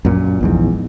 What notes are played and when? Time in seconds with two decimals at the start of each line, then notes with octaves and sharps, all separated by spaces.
0.05 F#2 A#2
0.41 A#1 E2 G#2